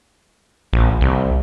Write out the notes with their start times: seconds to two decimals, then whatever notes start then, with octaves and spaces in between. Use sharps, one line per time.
0.73 A#1
1.01 C2